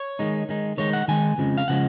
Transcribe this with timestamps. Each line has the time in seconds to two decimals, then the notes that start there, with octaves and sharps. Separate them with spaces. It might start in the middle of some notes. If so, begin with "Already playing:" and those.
Already playing: C#5
0.19 D#3 G#3 D#4
0.49 D#3 G#3 D#4
0.78 D#3 G#3 D#4 C#5
0.93 F#5
1.08 D#3 G#3 D#4 G#5
1.38 F2 C#3 F3 G#3
1.58 F5
1.68 C#3 F3 G#3 F#5